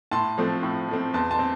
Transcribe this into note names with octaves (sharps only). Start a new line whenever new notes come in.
A2 A5 C6
F3 A3 C4
A2
F3 A3 C4
E2 A5 C6
A5 C6
C4